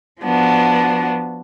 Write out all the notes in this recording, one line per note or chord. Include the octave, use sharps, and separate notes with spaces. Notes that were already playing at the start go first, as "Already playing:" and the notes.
F3 B3 D4 F#4